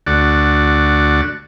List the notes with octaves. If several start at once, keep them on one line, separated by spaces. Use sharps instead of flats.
D2 F#4 D5